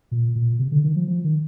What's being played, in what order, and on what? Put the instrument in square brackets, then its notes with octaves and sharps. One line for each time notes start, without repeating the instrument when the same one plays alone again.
[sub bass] A#2
A#2
C3
D3
D#3
F3
F3
D#3